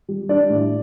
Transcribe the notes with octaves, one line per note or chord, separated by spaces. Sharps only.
G3
D4 D5
A2